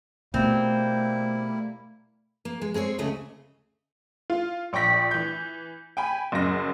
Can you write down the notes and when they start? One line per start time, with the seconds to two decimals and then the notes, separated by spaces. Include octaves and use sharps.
0.34 B2 G3 A3 A#3 C4 E4
2.45 A#3
2.62 G#3
2.74 G#3 C4 G#4 C#5
2.98 D2 C#3 A3 D#5
4.30 F4
4.73 A#1 D5 G5 C#6 A#6 B6
5.11 E3 G6
5.97 G5 G#5 B5
6.32 F#1 F#2 A#6